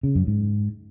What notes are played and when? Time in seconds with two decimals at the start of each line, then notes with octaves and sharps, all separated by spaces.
0.03 C#3
0.15 F#2
0.27 G#2